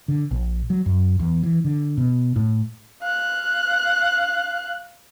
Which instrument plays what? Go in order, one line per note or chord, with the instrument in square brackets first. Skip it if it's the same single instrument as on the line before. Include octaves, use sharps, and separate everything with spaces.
[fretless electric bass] D3
A#1
F#3
F#2
E2
E3
D3
B2
A2
[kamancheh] F5 F#6